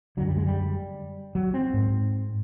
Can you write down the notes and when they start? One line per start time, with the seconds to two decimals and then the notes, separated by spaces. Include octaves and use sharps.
0.17 D3 F#3
0.20 F#2
0.27 G3
0.37 G#3
0.46 G3
1.35 F#3
1.54 C4
1.74 G#2